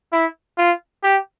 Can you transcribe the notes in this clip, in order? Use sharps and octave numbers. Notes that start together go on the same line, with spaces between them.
E4
F4
G4